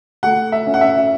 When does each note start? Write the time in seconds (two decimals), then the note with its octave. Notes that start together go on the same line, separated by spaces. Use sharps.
0.23 A3 F#5
0.52 E5
0.66 C#4
0.74 F#5
0.81 E5